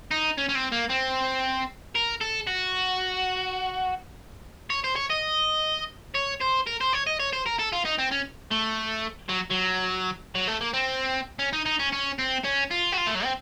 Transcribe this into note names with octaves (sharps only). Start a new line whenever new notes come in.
D#4
C#4
C#4
C4
A#3
C4
A#4
A4
F#4
C#5
C5
C#5
D#5
C#5
C5
A#4
C5
C#5
D#5
C#5
C5
A#4
A4
F4
D#4
C4
C#4
A3
F#3
F#3
F#3
A3
A#3
C4
C#4
D#4
D#4
C#4
C#4
C4
C#4
F4
F#4
F4
A3
F#3
C4